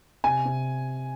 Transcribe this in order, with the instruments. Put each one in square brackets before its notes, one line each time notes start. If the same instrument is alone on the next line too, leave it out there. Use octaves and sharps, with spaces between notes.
[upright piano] C3 G#5
C3